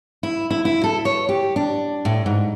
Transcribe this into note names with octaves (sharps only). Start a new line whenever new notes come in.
E4
E4
E4
A4
C#5
G4
D4
A2
G#2